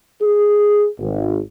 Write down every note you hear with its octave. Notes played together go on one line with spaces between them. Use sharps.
G#4
G#1